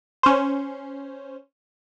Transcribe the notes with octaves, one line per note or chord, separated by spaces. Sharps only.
C#4 C5